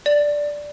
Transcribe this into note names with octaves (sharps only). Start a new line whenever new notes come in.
D5